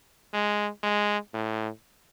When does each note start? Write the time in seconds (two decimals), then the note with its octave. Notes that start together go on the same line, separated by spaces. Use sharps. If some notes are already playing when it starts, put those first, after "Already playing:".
0.34 G#3
0.83 G#3
1.34 A2